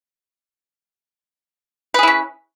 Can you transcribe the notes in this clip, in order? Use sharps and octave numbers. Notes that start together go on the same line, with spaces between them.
C#4 E4 G#4 B4